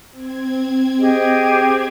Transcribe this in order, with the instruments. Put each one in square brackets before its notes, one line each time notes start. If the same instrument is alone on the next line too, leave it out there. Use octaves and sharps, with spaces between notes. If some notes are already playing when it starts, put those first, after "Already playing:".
[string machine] C4 G#6
[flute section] G4 G#4 D#5